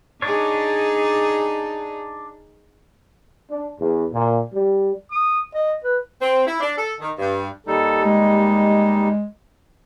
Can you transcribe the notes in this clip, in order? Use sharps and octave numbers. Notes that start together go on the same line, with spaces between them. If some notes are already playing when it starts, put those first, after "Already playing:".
D4 D#4 G#4 C#5
D4
E2
A#2
G3
D#6
D#5
B4
C4
E4
D4
A4
D#3
G2
D#2 G3 D#4 A4
G#3